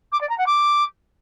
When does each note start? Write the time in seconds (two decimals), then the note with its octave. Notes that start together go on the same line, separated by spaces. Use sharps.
0.12 D6
0.20 D5
0.29 A#5
0.38 F#5
0.46 D6